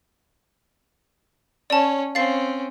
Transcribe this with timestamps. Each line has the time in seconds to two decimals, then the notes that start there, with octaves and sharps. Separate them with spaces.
1.70 C#4 C#5 D5 A5
2.15 C4 C#4 F5 A6 C7